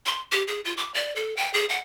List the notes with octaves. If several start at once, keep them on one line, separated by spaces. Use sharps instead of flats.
C6
G4
G#4
F4
D6
D5
A4
G5
G#4
F#5